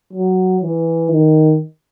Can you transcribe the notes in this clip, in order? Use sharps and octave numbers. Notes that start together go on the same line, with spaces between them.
F#3
E3
D#3